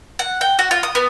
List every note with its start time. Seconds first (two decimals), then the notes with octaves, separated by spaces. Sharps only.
0.19 F#5
0.41 G5
0.59 F#4
0.71 F4
0.83 D#6
0.95 B3